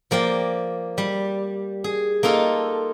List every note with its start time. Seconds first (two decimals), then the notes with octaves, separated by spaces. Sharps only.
0.11 F3 A#3 D5 G5
0.98 G3
1.84 G#4
2.23 A#3 D#4 F4 A4